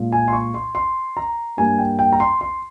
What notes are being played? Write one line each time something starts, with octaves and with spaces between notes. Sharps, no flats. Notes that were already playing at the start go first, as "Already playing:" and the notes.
Already playing: A#2 G#3
G#5
C6
C#6
C6
C6
A#5
G2 G3 A#3 G#5
G5
G5
A#5
C6
C6